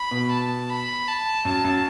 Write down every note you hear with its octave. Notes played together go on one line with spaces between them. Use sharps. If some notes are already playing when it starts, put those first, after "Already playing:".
Already playing: B5
B2
A5
B5
A5
F#2 A5
F#2